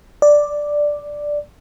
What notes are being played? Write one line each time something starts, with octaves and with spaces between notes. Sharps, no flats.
D5